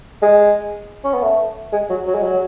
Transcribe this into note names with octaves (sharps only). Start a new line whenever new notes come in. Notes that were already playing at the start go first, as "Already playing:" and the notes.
G#3
C#4
B3
A3
G#3
F#3
F#3
G#3
F#3